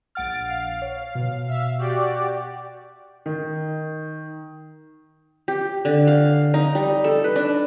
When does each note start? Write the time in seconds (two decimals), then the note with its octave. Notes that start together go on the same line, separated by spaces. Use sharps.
0.15 A#1 F#5 F6 A6 D7
0.44 F5
0.82 C#5
1.15 B2
1.48 E5 F5
1.78 F#4 G4 D5
3.26 D#3
5.48 G4
5.85 D3
6.07 F5
6.54 D#4
6.75 G3
7.04 A4
7.24 B4
7.36 D4